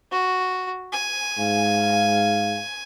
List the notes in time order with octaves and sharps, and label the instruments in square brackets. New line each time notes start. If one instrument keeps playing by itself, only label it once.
[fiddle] F#4
G#5
[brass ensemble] G#2 F5